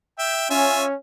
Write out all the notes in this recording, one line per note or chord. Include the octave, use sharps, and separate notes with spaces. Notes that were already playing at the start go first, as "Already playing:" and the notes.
E5 G5
C#4 F4 E5 G#5